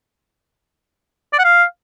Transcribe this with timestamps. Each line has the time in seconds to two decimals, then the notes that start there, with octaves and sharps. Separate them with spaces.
1.33 D5
1.39 F#5
1.44 F5